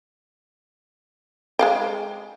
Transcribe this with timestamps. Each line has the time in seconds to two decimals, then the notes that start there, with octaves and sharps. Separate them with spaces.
1.59 G#3 F5 G5